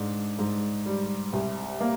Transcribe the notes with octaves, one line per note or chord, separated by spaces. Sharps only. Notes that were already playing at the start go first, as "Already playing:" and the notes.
Already playing: G#2 D4
G#2
G3
C2
A#3